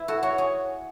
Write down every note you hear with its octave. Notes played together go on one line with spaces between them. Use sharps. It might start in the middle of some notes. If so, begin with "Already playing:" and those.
Already playing: E4
F#4 A4
F#4 C#5
G#4